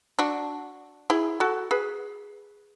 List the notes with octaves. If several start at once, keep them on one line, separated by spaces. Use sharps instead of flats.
D4 F#4
E4 G#4
F#4 A4
G#4 B4